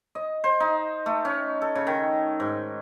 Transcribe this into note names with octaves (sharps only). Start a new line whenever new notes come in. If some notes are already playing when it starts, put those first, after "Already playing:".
D#5
C5
D#4
A3
C#4
A4
C#3
D#3
G#2